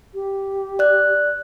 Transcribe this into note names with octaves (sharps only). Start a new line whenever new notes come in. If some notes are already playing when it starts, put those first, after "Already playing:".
G4
D5 F#6